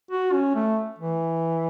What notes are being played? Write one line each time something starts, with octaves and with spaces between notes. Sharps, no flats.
F#4
C#4
A3
E3